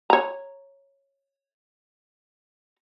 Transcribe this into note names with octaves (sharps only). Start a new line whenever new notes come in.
C#5 A#5